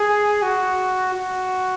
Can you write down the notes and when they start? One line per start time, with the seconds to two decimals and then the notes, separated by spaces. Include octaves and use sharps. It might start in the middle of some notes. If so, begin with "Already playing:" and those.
Already playing: G#4
0.42 F#4
1.14 F#4